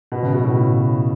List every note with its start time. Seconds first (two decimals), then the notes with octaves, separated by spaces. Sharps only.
0.12 B2
0.23 C#3
0.33 B2
0.44 A2